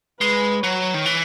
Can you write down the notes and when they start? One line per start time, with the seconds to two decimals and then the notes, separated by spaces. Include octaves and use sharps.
0.21 G#3 B4
0.63 F#3 C#5
0.94 D#3
1.06 E3